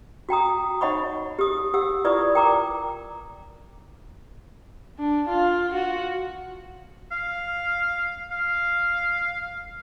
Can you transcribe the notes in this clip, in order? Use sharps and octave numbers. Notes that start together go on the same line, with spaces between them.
F#4 G5 A#5 D#6
D#4 C#5 D#5 F#5 B5 C#6
G4 D#6
G4 F#5 E6
E4 F4 B4 D5 C#6 D#6
A#4 G5 A#5 D6
D4
F4
F#4
F5
F5